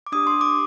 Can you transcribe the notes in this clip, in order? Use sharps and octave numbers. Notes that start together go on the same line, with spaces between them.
D6
D4 G4 D#6
C6
D6